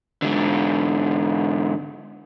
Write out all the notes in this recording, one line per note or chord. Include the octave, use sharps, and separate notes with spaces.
G#2 D3